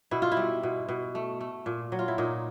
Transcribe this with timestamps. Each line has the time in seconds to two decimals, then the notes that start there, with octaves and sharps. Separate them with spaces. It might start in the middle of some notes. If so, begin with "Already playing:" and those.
0.11 B2 E4
0.22 F4
0.32 E4
0.37 G3
0.63 B2
0.89 B2
1.15 A3
1.41 A3
1.66 A#2
1.92 F#3
1.99 F4
2.08 E4
2.18 A#2 D#4